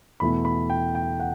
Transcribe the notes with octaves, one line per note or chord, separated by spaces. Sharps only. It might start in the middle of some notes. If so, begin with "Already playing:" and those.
E2 B2 A3 E4 B5
B5
G5
G5
F#5